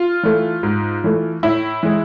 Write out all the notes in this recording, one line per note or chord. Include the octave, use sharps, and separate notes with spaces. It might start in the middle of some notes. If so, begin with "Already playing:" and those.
Already playing: F4
E3 A3
G#2
E3 A3
A2 E4
E3 G#3